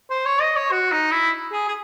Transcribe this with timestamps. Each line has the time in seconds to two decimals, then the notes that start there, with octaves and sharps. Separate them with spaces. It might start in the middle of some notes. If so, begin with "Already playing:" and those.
0.10 C5
0.26 C#5
0.41 D#5
0.56 C#5
0.71 F#4
0.92 D#4
1.11 E4
1.52 G#4
1.68 G#4